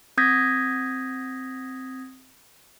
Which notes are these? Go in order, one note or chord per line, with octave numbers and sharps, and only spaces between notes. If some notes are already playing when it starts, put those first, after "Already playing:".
C4 D#6 G6 G#6 A#6 B6